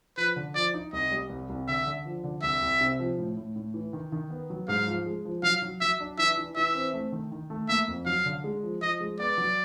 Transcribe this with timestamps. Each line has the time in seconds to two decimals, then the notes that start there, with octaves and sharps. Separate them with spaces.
0.17 F3 B4
0.36 D3
0.55 F3 D5
0.74 D#4
0.93 C2 D#5
1.11 G3
1.30 C2
1.49 C2
1.68 D3 E5
1.86 D3
2.06 F3
2.24 D3
2.43 C2 E5
2.62 C2
2.81 C3
2.99 F3
3.18 A2
3.37 A2
3.56 A2
3.74 E3
3.93 D#3
4.12 D#3
4.30 B3
4.50 F#3
4.68 G#2 F5
4.87 F3
5.06 G#3
5.25 F3
5.43 F#3 F5
5.62 F#3
5.81 F#3 E5
6.00 D4
6.18 E3 E5
6.37 E3
6.56 E3 E5
6.75 C4
6.94 A3
7.12 D#3
7.32 D#3
7.50 A3
7.69 A#3 E5
7.88 F2
8.06 F#3 F5
8.25 D3
8.44 G#3
8.63 F3
8.82 F3 D#5
9.00 G#3
9.20 B3 D5
9.38 F#3